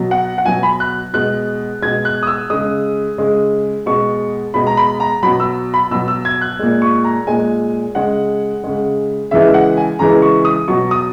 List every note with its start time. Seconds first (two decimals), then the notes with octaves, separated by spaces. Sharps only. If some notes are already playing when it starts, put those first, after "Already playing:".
Already playing: B2 F#3
0.11 F#5
0.38 F#5
0.45 B2 F#3 G#5
0.63 B5
0.80 F#6
1.14 B2 G#3 F#6
1.82 B2 G#3 G#6
2.05 F#6
2.23 D#6
2.27 E6
2.50 C#3 G#3 D#6
3.18 C#3 G#3
3.86 B2 G#3 C#6
4.54 B2 G#3 B5
4.67 A#5
4.77 B5
5.00 A#5
5.23 B2 F#3 B5
5.40 E6
5.74 B5
5.91 B2 F#3 E6
6.08 E6
6.25 G#6
6.41 F#6
6.59 A#2 G#3
6.82 C#6
7.04 A#5
7.27 A#2 G#3 G#5
7.95 C#3 G#3 F#5
8.64 C#3 G#3
9.31 C#3 E3 G#3 E5
9.54 F#5
9.77 G#5
9.99 C#3 E3 G#3 A#5
10.22 C#6
10.45 D#6
10.68 B2 F#3 C#6
10.91 D#6